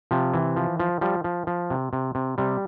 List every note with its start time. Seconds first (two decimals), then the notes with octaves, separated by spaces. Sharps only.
0.11 C3 F3
0.34 E3
0.56 F3
0.80 F3
1.01 F3 G3
1.24 F3
1.47 F3
1.70 C3
1.93 C3
2.15 C3
2.38 C3 G3